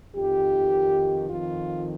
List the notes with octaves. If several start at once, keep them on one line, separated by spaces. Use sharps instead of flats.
F2 D#3 G4
F2 D#3 F4